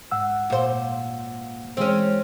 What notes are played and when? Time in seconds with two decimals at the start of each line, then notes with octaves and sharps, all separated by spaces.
0.11 G#2 F#5 E6
0.50 A#2 C5
1.77 E3 G#3 C4 C#4